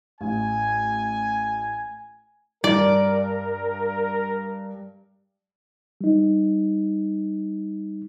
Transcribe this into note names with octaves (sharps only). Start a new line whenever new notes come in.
A1 G#5
G2 A#4 D5
G3 D#4